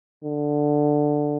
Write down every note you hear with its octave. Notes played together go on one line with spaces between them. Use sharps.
D3